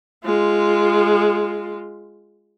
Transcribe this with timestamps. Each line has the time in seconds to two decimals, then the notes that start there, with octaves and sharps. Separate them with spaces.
0.25 G#3 F4